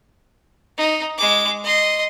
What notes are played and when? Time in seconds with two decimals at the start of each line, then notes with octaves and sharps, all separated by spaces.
0.78 D#4
1.18 G#3 D6
1.64 D#5 C6